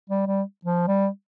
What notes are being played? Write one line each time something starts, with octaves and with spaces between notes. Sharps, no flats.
G3
G3
F3
G3